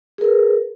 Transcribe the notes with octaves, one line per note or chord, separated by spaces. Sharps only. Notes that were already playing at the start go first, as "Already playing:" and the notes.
G#4 A#4 B4